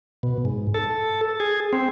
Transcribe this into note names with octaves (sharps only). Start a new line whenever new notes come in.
B2
G#2
A4
G#4
C4